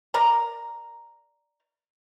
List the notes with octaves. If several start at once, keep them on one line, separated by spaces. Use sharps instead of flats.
A#4 D5 A#5